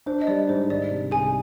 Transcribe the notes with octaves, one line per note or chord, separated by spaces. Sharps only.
D4 C5
D#5
G3 D5
G#2 C5
D#3 D5
C3
C2 G#4 G#5